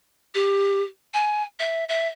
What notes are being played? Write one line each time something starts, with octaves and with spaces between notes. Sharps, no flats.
G4
G#5
E5
E5